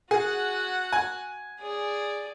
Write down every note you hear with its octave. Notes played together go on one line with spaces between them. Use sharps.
F#4 G#4 F#5
G#5
G#4 D5